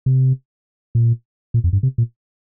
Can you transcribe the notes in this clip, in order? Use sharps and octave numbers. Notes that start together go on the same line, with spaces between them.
C3
A#2
A#2
F2
G2
C3
A#2